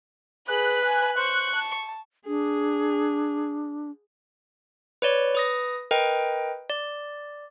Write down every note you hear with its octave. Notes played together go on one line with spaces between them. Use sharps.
G#4 B4 F#6
G#5
C5 C#6
A5
D4 G#4
B4 C#5 D5
B4 D#6 A#6
A#4 B4 D#5 G5
D5